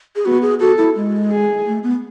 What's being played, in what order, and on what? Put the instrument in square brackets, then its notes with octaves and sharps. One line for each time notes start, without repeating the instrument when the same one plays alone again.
[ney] G#4
[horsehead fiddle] B3 [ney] F#4
[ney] G#4
[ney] F#4 [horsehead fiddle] A4
[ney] E4
G#3
[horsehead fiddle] G#4
[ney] A3
B3